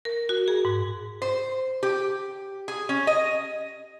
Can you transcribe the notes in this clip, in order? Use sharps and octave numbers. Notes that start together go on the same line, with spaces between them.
A#4
F#4
G#4
G#2
C5
G4
G#4
C#4
D#5